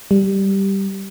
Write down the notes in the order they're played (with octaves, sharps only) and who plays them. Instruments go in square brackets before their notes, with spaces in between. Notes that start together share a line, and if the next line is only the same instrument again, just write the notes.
[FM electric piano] G3